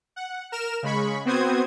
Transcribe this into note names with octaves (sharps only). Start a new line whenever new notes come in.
F#5
A#4 F6 E7
C#3 G#3 B5 C#6
B3 C4 F#4 C5 D#6 G#6